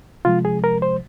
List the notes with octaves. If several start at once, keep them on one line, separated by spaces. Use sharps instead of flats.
C3 F3 G#3 F4
G#4
A#4
C5